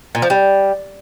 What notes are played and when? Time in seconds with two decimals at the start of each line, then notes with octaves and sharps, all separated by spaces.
0.15 A#2
0.22 F3
0.30 G3